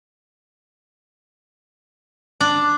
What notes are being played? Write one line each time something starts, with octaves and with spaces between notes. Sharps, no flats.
D4